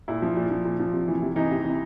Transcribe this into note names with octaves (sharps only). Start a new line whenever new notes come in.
A#2 E4
F3
A#2
F3
A#2
F3
C3
E3
C3
E3 D#4
C3
E3